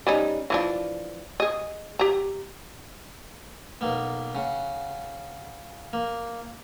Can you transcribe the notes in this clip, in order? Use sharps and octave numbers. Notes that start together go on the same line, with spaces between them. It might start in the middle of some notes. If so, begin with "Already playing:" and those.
G3 C#4 D#4
E3 F3 D4
G#4 D#5
G4 A#5
B1 A#3 B3
C#3 F#5
A#3